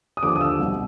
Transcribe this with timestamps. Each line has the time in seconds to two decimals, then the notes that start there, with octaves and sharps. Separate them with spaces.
0.17 D#6
0.23 D#2 D3 F3 D6
0.36 D#6
0.41 E6
0.59 C2 B2